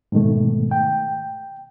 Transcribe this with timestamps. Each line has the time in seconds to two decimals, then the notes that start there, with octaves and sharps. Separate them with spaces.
0.12 G#2 B2 D#3 A3
0.71 G5